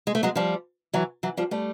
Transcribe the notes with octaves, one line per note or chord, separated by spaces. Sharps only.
G#3
A3
F#3 G#3
F3 G3
E3 F#3
E3 F#3
F3 G3
G3 A3